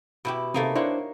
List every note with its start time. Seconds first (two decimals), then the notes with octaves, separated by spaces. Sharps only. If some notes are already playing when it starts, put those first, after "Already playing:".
0.25 B2 E4 G4
0.54 C3 A3 A#3 D#4
0.75 A#3 D4 E4 C5 C#5 F#5